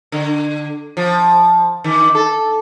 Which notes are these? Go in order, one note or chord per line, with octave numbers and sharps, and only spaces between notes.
D3
F3
D#3
A4